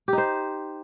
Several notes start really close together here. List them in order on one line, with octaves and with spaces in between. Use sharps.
G4 D#4 C5